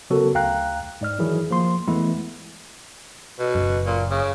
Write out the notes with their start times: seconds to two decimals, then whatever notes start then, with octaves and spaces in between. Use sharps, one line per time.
0.10 C#3 F#3 B3 F#4 A4 A#4
0.35 D2 F5 G5 A#5 F#6
1.01 G#2 D5 F6
1.19 D#3 E3 F#3 E4 G#4
1.51 F3 A#3 C6
1.88 E3 G#3 A3 B3 E4
3.39 B2
3.55 F#1 F#2
3.87 A#2
4.10 C#3